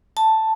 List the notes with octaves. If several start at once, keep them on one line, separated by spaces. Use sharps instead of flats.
A5